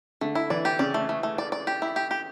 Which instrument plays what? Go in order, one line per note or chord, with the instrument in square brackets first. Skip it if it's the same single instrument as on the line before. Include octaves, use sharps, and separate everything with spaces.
[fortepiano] D3 [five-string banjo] A3
[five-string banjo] E4
[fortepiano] E3 [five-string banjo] D5
[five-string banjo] G4
[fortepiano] C#3 [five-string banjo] D5
[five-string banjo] A3
A3
A3
D5
D5
G4
E4
G4
G4